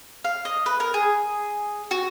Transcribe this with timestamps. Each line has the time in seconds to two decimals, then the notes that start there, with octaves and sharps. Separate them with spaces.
0.25 F5
0.45 D#5
0.66 B4
0.80 A#4
0.94 G#4
1.91 F#4